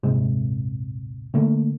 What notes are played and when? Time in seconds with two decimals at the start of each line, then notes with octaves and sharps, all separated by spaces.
0.03 D#1 G#1 C3 G#3
1.34 D3 A3 A#3